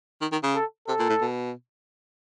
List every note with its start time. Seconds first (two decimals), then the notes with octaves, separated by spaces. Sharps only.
0.21 D#3
0.32 D#3
0.43 C#3
0.55 A4
0.87 C3 A4
0.99 A#2
1.09 A2
1.21 B2